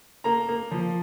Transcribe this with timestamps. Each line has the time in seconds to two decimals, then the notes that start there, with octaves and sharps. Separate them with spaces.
0.24 A#3 A#5
0.49 A#3
0.71 F3